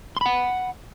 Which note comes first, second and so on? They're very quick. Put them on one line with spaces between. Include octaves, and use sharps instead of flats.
C6 B5 F#5